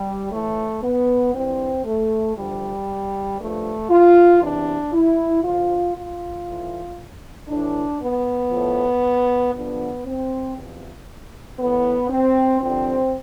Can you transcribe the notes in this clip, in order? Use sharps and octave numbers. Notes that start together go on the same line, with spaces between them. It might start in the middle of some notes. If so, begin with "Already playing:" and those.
Already playing: G3
A2 E3 A3
B3
G2 E3 C4
A3
D2 D3 F3 G3
G2 F3 A3
F4
E2 C3 E3 D4
E4
D2 D3 F3 F4
F4
A2 E3
A2 E3 D4
B3
A2 F3
G2 D3 F3 B3
C4
E2 C3 F3
A2 E3 B3
C4
G2 D3 F3 C4